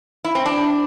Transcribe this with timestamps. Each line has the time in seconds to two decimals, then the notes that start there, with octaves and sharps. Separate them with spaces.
0.25 E4
0.35 C4
0.46 D4